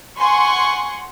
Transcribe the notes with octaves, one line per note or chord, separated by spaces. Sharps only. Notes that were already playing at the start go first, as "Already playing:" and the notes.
F#5 G#5 C6 C#6